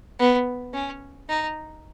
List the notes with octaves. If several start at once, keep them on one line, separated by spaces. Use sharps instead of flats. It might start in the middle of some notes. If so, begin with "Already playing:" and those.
B3
C#4
D#4